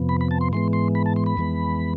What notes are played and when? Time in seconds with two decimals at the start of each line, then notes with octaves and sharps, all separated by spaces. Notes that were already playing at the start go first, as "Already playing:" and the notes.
Already playing: F2 C3 F3 B3
0.09 B5
0.21 B5
0.31 A5
0.41 C6
0.53 G#2 E3 G#3 B3 C6
0.73 C6
0.95 B5
1.06 A5
1.16 C6
1.26 B5
1.37 F2 E3 G#3 B3